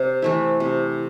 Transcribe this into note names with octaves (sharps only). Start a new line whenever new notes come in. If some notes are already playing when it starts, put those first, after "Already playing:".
Already playing: C3 C5
E3 A3 E4
C3